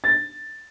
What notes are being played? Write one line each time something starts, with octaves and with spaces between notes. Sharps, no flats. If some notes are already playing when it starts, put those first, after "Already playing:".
A6